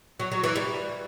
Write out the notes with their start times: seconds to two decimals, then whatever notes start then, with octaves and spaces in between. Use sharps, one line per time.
0.20 F#3
0.32 F#3
0.44 E3
0.56 G3